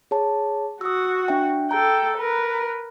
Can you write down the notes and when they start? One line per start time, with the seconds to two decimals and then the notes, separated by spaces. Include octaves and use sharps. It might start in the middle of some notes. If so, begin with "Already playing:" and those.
0.11 G#4 C#5 A5
0.81 F#4 F#5 D#6 E6
1.28 D4 E5 G5
1.71 A4 G5 A#5
2.18 A#4 B4